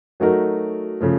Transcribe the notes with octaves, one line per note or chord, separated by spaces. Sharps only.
F#3 A3 D#4 F#4 A#4
C#3 F3 A3